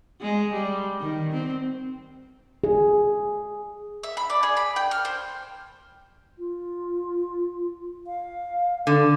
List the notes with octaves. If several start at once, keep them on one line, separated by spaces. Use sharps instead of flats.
G#3
G3
D#3
C4
G#4
E5
B5
D5
G#4
B5
G5
F6
C5
F4
F5
D3 A4